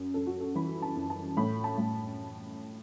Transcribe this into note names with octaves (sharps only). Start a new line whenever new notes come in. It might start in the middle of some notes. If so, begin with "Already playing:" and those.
Already playing: F#2
F#2 A4
F#4
A4
E3 B5
A5
F#2
A5
A2 B5
A5
A2